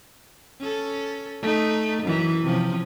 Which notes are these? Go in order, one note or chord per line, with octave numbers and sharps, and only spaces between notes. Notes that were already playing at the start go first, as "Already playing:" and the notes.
C#4 A4
A3 D#4
F#2 E3
C3 F3 C#4